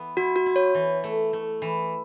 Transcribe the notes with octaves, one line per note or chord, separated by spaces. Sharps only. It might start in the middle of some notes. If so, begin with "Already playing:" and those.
Already playing: E3 B3
E4 F#4
F#4
E4
C#5
E3
A3
A3
E3